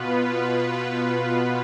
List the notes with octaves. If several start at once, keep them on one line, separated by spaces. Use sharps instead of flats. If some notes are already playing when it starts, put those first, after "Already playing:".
Already playing: B2 B3 F4 B4